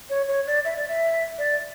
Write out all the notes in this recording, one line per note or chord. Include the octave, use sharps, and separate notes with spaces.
C#5
C#5
D5
E5
D5
E5
D5